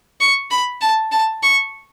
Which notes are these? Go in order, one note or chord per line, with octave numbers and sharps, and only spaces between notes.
C#6
B5
A5
A5
C#6